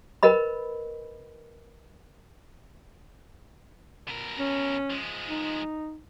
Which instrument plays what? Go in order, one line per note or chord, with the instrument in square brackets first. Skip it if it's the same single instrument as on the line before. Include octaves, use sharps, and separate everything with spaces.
[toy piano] A#4 B4 D#5 B5
[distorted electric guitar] B2 A#4
[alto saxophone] C#4
[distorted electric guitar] F3 G#3
[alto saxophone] D#4